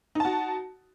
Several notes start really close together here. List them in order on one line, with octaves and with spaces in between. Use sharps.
D#4 A5 F#4